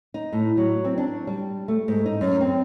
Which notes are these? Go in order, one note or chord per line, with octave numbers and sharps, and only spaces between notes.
D#4
A2
F#3
C4
D4
G3
A3
G#2
D#4
F#2
C4